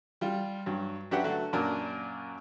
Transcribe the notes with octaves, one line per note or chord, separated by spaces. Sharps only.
G3 F4
G2 F#3
F#3 D4 G4 B4 E5 F#5
D3 F#3 A3 F#4 A4
F#2 A#2 D4 F#4 A#4